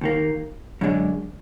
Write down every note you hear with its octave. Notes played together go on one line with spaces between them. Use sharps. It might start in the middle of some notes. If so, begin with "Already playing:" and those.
D#2 D#3 A#3
F#2 D3 G#3 D4